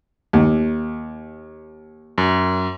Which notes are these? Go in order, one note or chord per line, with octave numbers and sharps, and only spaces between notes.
D#2
F#2